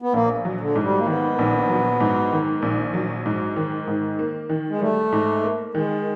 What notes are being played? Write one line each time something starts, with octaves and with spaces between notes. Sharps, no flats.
B3
A#1 A#3
F#3
D3
G#2
G3
A#3
D#3 B3
A#1
F#3
G#2
D#3
A#1
F#3
G#2
D#3
G#2
A#3
D#3
G#3
G3 A3
G#2
A#3
D#3 G#3